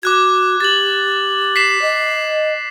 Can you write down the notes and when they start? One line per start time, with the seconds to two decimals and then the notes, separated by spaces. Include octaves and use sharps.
0.03 F#4 D6 F#6 G#6
0.60 G4 A6 F#7
1.56 B6 C7 E7
1.82 D#5